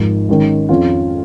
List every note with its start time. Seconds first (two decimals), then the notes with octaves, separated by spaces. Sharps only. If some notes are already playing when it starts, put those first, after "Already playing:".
Already playing: G#1 G#2 F3
0.29 G#1 G#2 D#3 C#4
0.69 F2 F3 C#4 F4